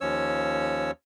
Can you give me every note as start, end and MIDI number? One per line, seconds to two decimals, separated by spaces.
0.01 0.91 39
0.01 0.91 53
0.01 0.91 61
0.01 0.91 73
0.01 0.91 88